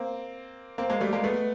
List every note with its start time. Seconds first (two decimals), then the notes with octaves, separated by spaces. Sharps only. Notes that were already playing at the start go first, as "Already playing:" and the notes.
Already playing: A#3 C4
0.78 A#3 C4
0.90 G#3 A#3
1.01 G3 A3
1.13 G#3 A#3
1.24 A3 B3